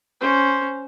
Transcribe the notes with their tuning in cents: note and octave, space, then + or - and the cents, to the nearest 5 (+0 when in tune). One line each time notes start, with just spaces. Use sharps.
C#4 +0 C5 +0